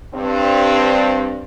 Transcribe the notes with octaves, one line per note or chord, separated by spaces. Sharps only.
G2 C4